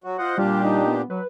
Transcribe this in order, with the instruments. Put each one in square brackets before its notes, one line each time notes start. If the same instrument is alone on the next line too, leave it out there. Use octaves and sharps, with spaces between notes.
[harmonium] F#3 F#4
[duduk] F4 [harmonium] C5 D#5 F#5
[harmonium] A#2 D4 G4 [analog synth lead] G3 [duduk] F4
[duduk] D#4
[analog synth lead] B3
[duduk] F#3 [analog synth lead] B4